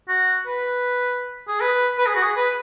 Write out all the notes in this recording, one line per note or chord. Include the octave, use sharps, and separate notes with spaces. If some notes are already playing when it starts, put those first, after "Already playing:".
F#4
B4
G#4
B4
B4
G#4
F#4
G#4
B4